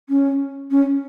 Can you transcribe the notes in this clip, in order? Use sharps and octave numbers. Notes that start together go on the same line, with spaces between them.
C#4
C#4